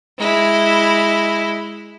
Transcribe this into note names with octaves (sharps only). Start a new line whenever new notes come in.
G#3 E4